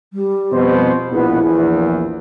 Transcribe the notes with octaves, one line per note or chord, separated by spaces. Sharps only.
G3
F2 B2 C5
A#1 B2 B3 E4
A#1 E2